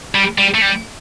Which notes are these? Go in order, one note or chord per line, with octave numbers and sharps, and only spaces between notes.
G3
G3
A3
G3